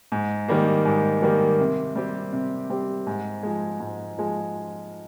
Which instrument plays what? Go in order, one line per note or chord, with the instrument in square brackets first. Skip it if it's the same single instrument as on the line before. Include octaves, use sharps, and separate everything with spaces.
[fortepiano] G#2
D#3 G3 A#3
G#2
D#3 G3 A#3
C3
G3 C4 G4
C3
G3 C4 G4
G#2
F3 G#3
G#2
F3 G#3